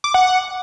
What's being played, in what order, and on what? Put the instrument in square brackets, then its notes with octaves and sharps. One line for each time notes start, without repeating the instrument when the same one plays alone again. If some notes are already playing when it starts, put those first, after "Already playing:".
[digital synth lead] D6
F#5
F#5